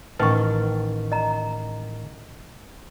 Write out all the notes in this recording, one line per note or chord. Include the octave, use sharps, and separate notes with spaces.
A1 D#3 B4 A5 C#6
D#5 A#5